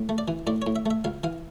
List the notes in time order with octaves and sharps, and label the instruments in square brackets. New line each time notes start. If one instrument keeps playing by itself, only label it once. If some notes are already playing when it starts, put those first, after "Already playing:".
Already playing: [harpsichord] A2
A3
D5
E3
A2 D5
A2 C#5
E5
A3 E5
C#2 F5
E3 F5